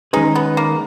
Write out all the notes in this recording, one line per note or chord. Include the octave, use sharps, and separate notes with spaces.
D#3 G#3 C#4 D#4 G#4 B4
B3
A#3